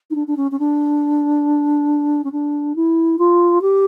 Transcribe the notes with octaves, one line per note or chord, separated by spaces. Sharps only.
D#4
D4
D4
C#4
C#4
D4
C#4
D4
E4
F4
G4